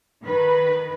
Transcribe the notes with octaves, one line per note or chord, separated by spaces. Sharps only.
D#3 B4